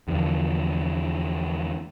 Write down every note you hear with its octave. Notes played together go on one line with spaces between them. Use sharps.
E2 D3 F3 D4